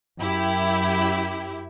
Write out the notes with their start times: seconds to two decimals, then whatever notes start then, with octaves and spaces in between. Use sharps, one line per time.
0.18 F#2 E4 G4